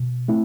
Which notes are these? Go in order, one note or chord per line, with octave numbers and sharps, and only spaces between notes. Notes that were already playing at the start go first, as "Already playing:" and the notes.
Already playing: B2
A3 C4 E4